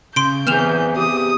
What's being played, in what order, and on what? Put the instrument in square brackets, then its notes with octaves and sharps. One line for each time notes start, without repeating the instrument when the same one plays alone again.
[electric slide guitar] C#3 [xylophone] C6 D7 [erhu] G6
[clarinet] E3 [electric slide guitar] B3 C4 G#4 [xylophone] F6 E7 F7
[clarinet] G4 [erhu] D#6